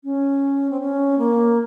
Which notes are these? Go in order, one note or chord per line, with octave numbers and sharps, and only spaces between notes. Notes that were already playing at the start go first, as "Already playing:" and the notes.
C#4
C4
C#4
A#3